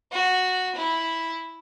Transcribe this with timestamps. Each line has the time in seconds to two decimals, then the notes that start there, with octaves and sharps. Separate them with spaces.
0.12 F#4
0.75 E4